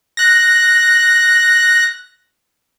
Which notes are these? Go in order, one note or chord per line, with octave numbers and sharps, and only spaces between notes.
F#6 A#6